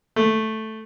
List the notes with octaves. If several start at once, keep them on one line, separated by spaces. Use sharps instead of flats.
A3